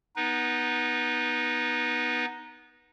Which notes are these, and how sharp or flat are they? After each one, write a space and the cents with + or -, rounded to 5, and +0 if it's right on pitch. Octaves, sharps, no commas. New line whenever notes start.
B3 +0 D#4 +0 B4 -20